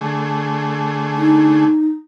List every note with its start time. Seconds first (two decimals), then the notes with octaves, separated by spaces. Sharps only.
0.01 D3 A3 G#4
1.17 D#4